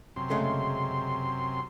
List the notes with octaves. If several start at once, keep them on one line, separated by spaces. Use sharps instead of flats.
F#2 C3 C6
C#3 G#3 A3